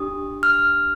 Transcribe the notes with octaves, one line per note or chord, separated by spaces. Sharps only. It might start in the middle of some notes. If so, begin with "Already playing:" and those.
Already playing: D4 G4 D#6
F6